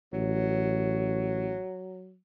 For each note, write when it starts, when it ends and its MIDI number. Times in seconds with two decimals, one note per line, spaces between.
0.13 1.56 33
0.13 2.17 54